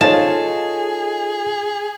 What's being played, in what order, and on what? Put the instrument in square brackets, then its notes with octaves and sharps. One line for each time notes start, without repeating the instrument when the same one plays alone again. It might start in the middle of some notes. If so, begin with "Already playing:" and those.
[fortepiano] D#4 C#5 [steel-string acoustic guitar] F4 A4 F5 [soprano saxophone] G#4 [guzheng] A5